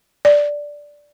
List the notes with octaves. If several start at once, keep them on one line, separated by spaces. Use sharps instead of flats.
D5